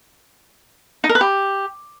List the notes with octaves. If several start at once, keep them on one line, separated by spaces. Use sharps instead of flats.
D#4
A#4
B4
G4